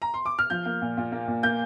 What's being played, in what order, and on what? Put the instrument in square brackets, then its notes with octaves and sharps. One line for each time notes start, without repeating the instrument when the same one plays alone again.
[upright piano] A#5
C6
D6
F6
F3 G6
A#3
A#2
A#2
A#3
A#2
A#3 G6